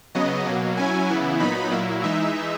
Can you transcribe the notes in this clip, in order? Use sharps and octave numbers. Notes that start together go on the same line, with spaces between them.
C#3 F#3 B3 D#5
B2 F#3 A#3
F#3 C#4 E4 G#5
C#3 E3 B3 E4
A#2 F#3 B3 D#4 B5
A#2 F#3 A#3 E4
E3 G#3 D#4 E5